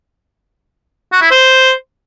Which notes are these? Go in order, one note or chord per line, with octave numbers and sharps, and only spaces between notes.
F#4
E4
C5